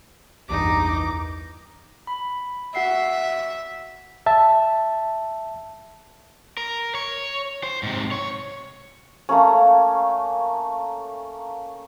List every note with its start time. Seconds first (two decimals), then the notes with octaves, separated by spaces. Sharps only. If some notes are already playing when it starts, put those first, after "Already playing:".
0.49 A#1 E2 G2 D#4 D6
2.07 B5
2.75 F#4 E5 F#5 C7
4.26 E5 A5
6.57 A#4
6.95 C#5
7.63 C5
7.83 G#2 C3
8.11 C#5
9.29 A3 A#3 C#4